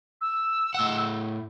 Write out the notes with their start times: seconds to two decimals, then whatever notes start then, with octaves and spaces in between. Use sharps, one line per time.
0.21 E6
0.74 A2 F#5